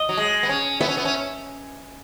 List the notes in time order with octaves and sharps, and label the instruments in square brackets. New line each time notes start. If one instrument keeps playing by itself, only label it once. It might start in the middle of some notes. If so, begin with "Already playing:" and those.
Already playing: [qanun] D#5
[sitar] F#3
G#3
B3
C#4
[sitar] B3 [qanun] E5
[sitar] C#4
B3
C#4